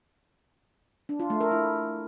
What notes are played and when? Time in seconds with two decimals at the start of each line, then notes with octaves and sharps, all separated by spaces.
1.09 D4
1.20 F4
1.30 A3
1.41 A#4
1.51 E4